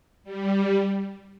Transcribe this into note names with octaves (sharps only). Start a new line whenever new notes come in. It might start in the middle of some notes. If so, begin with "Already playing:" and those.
G3